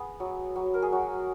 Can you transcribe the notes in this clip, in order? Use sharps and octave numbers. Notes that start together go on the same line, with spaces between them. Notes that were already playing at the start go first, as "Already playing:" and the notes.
Already playing: B3 G#4
F#3
F#3
A#4
G#4
F#3 F#4